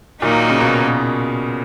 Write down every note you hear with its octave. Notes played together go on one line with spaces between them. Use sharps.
A#2 D#3 F#3 A#3 D#4
C#3
B2